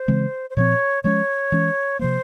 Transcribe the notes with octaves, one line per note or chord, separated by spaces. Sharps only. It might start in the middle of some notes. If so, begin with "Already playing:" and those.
Already playing: C5
C#3 E3 G#3 C4
C5
A#2 F3 C4 C#5
F3 G#3 C#4 C#5
E3 G#3 C#4
C3 F3 A#3 C5